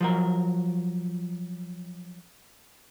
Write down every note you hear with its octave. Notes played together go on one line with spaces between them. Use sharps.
F3 F#3 A#4